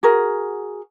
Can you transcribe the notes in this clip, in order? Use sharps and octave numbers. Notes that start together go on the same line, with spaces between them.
F#4 G#4 A#4